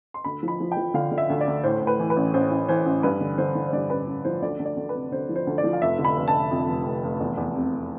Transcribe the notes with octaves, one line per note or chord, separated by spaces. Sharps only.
C6
D2 B5
F3
B5
F3
G5
F3
D3 F5
D3
E5
D2
D5
D2
A2 C5
A2
B4
E3
B4
A1
A1 C5
A1
E3 C5
A1
G2 B4
D3
D3 C5
D3
C5
G2 D5
A1 B4
A1
F3 C5
D2 D5
D2
D5
D2
B4
C3
D2 C5
F3
C5
D2
D5
F3
F5
F1 E5
D3
B5
F1
A5
F1
F2
F1
F1
F1
E2
E2
C3
C3